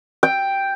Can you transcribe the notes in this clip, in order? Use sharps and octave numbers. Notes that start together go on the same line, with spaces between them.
G5